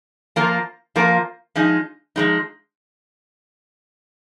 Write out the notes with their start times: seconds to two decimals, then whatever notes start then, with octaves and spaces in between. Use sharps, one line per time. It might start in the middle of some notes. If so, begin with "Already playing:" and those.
0.36 F3 A#3 F4 A#4
0.96 F3 A#3 F4 A#4
1.55 F3 G#3 D#4
2.16 F3 G#3 D#4